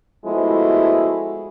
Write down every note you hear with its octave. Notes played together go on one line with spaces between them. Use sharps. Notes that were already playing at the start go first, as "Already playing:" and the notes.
F3 G#3 A3 B3 E4 F#4